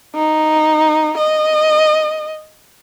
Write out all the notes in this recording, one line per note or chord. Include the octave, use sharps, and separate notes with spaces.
D#4
D#5